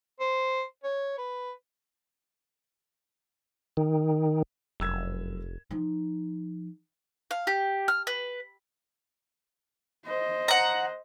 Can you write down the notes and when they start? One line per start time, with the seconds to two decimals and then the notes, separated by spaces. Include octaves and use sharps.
0.20 C5
0.84 C#5
1.18 B4
3.77 D#3
4.80 F1 F#2 E6 G#6
5.71 F3 D#4
7.31 F5
7.47 G4
7.88 F6
8.07 B4
10.06 C5 D#5
10.48 F#5 A#5